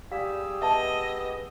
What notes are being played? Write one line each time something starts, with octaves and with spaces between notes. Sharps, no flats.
G3 G4 G#4 F5 E6
B3 D#5 E5 A5